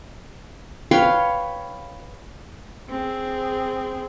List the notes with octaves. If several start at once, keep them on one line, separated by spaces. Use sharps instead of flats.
B4 C#5 F5 G5
C4 G#4